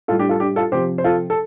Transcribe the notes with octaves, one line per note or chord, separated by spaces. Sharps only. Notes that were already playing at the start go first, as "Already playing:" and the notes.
A2 G3 F4 A4
D4 G4
F4 A4
D4 G4
F4 A4
C3 F3 G4 C5
C5
F4 A4
A4